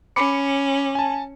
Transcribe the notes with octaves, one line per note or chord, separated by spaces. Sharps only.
C#4 B5 D6 C#7
G#5 A5